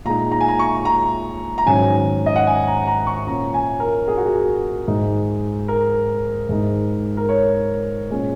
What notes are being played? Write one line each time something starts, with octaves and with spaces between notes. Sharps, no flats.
A#2 G#3 D#4 A#5
A#5
G#5
A#5
C#6
A#5
A#5
G#2 D#3 F#3 C#4 G#5
D#5
F#5
G#5
A#5
A#5
C#6
A#2 A#3 C#4 A#5
G#5
A#4
G#4
F#4
G#4
G#2 G#3 D#4
A#4
G#2 G#3 D#4
A#4
C#5
A#2 G#3 C#4